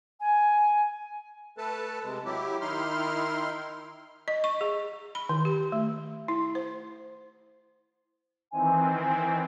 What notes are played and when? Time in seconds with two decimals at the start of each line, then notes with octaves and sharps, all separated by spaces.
0.20 G#5
1.58 A3 A4 B4 A5
2.03 C3 G#3
2.25 F#3 E4 G4
2.61 D#3 D#4 E4 C6 F6
4.28 D#5
4.44 C#6
4.61 G#4
5.15 B5
5.29 D#3
5.45 G4
5.72 A3
6.28 E4
6.55 C5
8.52 D#3 E3 C4 G#5